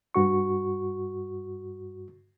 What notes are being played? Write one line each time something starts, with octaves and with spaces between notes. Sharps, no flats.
G2 F#4 C#6